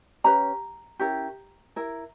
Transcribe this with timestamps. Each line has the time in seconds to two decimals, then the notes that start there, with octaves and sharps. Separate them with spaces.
0.24 C#4 G4 B4 A#5
0.99 C#4 E4 G4 A#4
1.76 E4 A#4